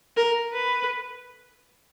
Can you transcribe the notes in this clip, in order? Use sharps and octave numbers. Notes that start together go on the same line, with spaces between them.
A#4
B4